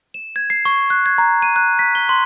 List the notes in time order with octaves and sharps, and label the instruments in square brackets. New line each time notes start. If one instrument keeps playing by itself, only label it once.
[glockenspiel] E7
G#6
C7
C#6
F#6
G#6
A#5
D#7
F#6
B6
G7
C6